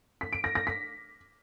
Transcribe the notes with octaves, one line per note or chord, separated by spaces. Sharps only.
B6
D7
A#6
A#6
B6